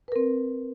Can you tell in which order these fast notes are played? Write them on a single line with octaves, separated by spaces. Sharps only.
B4 A#4 C4